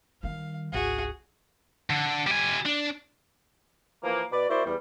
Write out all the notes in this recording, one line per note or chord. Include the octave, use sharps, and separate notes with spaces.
D#3 G3 F5
G#1 C#2 F#4 G#4
D3
G3 G#5
D4
E3 F3 A#3
B2 B4 D5
A#3 E4 F#4 C5 D5
E2 G3